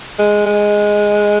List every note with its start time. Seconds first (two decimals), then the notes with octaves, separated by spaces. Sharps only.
0.19 G#3
0.46 G#3